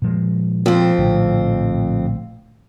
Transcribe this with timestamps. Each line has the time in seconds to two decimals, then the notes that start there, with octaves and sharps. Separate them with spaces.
0.02 A#2 F3 G#3
0.66 F2 C4
0.98 A#1 A2 D3